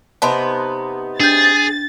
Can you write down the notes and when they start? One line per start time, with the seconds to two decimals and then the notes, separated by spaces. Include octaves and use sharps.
0.22 C3 B3 D#4 A5 B5 C6
1.20 D4 G#4 G6 A6